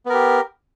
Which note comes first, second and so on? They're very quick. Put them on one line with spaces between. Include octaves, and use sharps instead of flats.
B3 A#4 G4